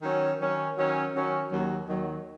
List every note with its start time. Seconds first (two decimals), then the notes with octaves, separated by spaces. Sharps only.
0.02 D#3 F#3 C#4
0.40 D#3 F#3 C#4
0.77 D#3 F#3 C#4
1.14 D#3 F#3 C#4
1.51 D#2 D#3 F#3
1.87 D#2 D#3 F#3